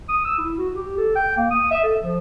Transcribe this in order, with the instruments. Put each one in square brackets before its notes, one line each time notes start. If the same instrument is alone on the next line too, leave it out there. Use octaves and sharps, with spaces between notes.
[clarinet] D#6
E6
E4
F#4
G4
A4
G5
A#3
D#6
E5
A4
F3